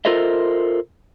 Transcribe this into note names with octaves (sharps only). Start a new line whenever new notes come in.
F4 A4 A#4 C5 D#5 E5